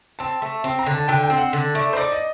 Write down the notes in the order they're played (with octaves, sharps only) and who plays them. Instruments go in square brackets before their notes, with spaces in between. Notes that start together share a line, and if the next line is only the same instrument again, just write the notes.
[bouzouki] C4 [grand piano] A5
[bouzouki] A3
[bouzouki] C4 [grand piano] C6
[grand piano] A#5
[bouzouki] D3
[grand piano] A5
[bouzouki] D3 [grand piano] G5
[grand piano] G5
[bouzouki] C4
[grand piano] F#5
[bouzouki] D3
[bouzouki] A3 [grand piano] D5
[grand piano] C5
[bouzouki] D#4 [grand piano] D5
[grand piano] D#5